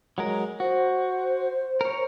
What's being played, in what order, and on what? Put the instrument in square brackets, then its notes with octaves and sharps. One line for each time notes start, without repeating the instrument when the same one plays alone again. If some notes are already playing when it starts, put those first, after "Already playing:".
[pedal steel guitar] F#3 G#3 A#4
[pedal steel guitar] F#4 [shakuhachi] C5
[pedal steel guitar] A#4 C#5